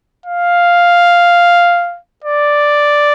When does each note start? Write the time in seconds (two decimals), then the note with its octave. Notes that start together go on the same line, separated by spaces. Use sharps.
0.26 F5
2.24 D5